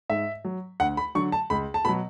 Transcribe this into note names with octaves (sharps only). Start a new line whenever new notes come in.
G#2 E5
F#3
D2 F#5
B5
D3 F#3 C#6
A5
C#2 B5
A5
B2 F#3 B5